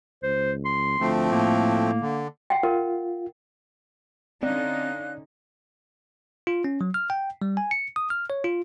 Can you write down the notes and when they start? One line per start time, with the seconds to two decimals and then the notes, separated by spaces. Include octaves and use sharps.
0.23 C#2 C5
0.65 C6
1.00 D2 F3 A3 C4
1.31 A2 A#3
2.01 D3
2.50 F#5 G5
2.63 F4 A#4
4.43 D3 C4 C#4 D#4 D5 F5 F#6
6.47 F4
6.64 C#4
6.81 F#3
6.94 F6
7.10 G5
7.42 G3
7.57 G#5
7.71 C#7
7.96 D#6
8.10 F6
8.30 C#5
8.44 F4